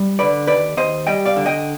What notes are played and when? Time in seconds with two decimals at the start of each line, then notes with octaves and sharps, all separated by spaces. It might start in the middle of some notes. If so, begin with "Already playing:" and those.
Already playing: G3
0.19 D3 B4 D5
0.47 D#2 B4 D5
0.77 D#2 C5 D#5
1.07 G3 D#5 G5
1.26 D5 F5
1.36 D3
1.46 D#5 G5